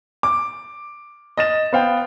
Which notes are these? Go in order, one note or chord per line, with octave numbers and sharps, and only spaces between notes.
D6
D#5 A6 E7
B3 C5 F5 G5